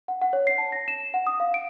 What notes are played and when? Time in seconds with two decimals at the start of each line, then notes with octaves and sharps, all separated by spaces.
0.08 F#5
0.22 F#5
0.33 C#5
0.47 C7
0.58 A5
0.72 A#6
0.88 E7
1.14 F#5
1.27 D#6
1.40 F5
1.54 D7